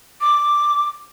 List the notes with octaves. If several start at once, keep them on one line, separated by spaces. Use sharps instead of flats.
D6